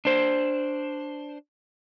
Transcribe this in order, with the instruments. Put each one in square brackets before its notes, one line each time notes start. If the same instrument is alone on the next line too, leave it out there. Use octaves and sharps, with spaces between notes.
[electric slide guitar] D4 C5